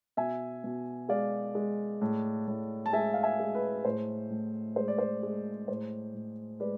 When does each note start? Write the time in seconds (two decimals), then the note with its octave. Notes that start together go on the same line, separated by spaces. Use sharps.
0.17 B2 E5 G#5
0.64 B2
1.09 G#3 D5 F5
1.55 G#3
2.02 A2
2.48 A2
2.86 A5
2.93 G#3 E5 G#5
3.14 F5
3.23 E5 G#5
3.40 G#3
3.55 B4
3.85 A2 C5
4.30 A2
4.76 G#3 C5
4.88 D5
4.98 C5
5.23 G#3
5.68 A2 C5
6.15 A2
6.60 G#3 B4 D5